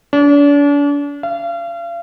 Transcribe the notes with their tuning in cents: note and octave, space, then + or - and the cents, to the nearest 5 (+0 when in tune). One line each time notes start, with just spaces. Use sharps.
D4 -40
F5 -35